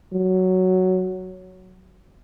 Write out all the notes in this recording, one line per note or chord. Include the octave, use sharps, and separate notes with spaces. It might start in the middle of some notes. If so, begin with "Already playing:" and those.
F#3